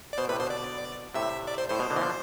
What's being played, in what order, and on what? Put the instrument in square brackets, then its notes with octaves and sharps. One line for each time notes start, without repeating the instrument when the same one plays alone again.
[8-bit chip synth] D5
[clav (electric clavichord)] B2 [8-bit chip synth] C5
[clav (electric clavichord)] A2 C3 [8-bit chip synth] B4
[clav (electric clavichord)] B2 D3 [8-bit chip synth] C5
[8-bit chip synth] D5
[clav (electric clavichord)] A2 C3 [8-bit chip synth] E5
[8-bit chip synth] D5
C5
[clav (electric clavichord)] A2 [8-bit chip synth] C5
[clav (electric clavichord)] B2
B2 D3
E3
D3 F3